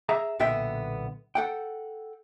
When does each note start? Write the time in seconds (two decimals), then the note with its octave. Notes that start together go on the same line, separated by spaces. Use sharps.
0.09 G#4 E5 A#5
0.39 B1 A#2 D3 B3 E5 G5
1.35 A4 F#5 G5